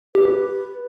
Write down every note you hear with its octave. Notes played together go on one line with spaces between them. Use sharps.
G4 B4